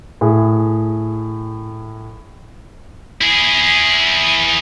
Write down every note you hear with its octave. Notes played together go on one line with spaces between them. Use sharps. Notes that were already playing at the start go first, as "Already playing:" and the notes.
A2 G#4
E4 G#4